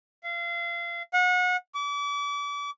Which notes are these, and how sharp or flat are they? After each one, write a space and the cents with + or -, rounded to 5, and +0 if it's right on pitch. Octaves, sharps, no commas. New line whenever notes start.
F5 -30
F#5 -30
D6 -35